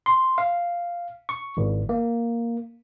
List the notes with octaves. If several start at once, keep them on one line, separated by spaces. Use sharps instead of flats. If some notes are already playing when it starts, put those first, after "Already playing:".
C6
F5
C#6
G#1
A#3